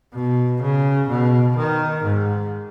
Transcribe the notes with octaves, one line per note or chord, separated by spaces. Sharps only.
B2
C#3
B2
D#3
G#2